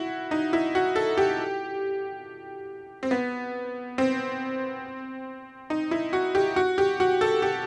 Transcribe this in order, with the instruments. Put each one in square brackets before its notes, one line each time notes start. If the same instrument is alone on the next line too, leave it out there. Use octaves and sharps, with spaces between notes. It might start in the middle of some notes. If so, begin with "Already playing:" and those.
Already playing: [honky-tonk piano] E4 F#4
D#4
E4
F#4
A4
G4
C4
B3
C4
D#4
E4
F#4
G4
F#4
G4
F#4
A4
G4